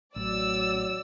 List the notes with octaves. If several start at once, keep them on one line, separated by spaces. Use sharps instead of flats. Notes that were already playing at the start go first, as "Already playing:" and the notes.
A1 F#3 D5 E6